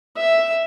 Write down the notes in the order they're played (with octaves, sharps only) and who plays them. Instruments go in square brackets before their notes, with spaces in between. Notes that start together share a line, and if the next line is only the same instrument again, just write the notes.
[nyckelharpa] E5